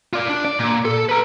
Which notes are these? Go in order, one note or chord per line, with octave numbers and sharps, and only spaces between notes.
F4 D5
D4
D5
A#2
A4
B4 A#5